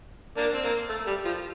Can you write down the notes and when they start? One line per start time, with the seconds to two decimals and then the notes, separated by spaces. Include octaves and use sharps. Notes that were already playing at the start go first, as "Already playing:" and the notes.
0.37 A#3 D4
0.54 C4
0.64 A#3
0.90 A3
1.07 G3
1.25 F3